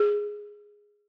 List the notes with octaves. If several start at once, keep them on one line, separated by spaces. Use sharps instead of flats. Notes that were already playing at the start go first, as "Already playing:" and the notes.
Already playing: G#4